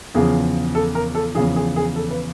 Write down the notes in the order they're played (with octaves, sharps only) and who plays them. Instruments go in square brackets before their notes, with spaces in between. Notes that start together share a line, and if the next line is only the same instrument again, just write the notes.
[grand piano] E2 C#3 F3 G#4
A4
A#4
A4
E2 C#3 F3 G#4
G#4
G#4
A4
B4